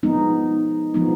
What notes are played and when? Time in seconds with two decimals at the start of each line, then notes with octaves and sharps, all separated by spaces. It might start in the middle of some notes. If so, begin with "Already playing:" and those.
0.03 F3 G#3 B3 D#4
0.94 F3 G#3 B3 D#4